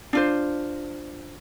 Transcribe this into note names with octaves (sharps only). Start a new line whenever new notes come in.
D4 F4 C5